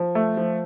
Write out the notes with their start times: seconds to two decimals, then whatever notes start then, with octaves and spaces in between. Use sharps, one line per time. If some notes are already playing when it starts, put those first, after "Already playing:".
Already playing: F3
0.15 A3
0.37 F3